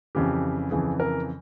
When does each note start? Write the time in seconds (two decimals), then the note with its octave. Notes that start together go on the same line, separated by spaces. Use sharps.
0.15 F2 C#3 E3 G4
0.71 F2 C#3 E3 G#4
1.00 A#4